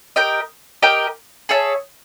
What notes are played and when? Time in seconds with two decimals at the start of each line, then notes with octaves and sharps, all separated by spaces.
0.16 G4 A#4 D#5 G5
0.82 G4 A#4 D#5 G5
1.49 G#4 C#5 E5 A5